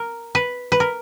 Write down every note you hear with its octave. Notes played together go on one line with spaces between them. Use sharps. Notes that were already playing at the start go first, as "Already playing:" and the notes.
Already playing: A#4
B4
B4
A#4